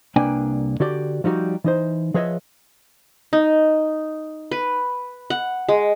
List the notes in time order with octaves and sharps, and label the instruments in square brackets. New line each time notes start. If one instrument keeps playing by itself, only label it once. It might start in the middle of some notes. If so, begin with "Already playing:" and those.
[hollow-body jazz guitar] C2 A#3 D4 B4 G5 G#5
D3 F#4 G4 D5
F3 G3 D#4 F#4
E3 D#4 C5
F3 G#4 B4 C#5 D#5 E5
[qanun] D#4
B4
F#5
G#3